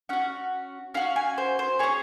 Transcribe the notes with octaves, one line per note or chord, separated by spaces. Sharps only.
C#4 F#4 F#5
C#4 F#4 F5
G#5
C5
C5
C#4 G#4 C#5